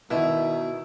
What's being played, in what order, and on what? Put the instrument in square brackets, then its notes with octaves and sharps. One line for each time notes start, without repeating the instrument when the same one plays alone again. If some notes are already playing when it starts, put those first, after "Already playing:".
[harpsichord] B2 [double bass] D#3 [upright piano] E4